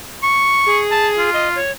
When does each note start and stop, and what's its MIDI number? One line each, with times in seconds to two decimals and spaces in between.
0.23 0.80 85
0.66 1.30 68
0.91 1.08 81
1.18 1.58 65
1.34 1.49 75
1.55 1.71 73